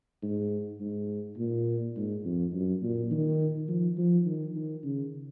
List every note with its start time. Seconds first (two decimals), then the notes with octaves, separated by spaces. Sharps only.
0.23 G#2
0.80 G#2
1.38 A#2
1.96 G#2
2.24 F2
2.53 F#2
2.82 A#2
3.11 D#3
3.68 F3
3.97 F3
4.26 D#3
4.56 D#3
4.84 C#3